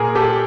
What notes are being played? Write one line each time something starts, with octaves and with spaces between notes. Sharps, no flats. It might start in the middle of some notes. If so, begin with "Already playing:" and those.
Already playing: A#2 G#4 A#4
G4 A4